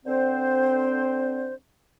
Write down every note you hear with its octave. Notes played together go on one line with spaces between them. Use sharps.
D3 C4 C5